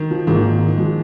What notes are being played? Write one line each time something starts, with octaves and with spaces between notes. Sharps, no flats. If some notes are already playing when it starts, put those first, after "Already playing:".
Already playing: D#3
F3
G#1 G#2 D#3 F3 A#3
F3 G#3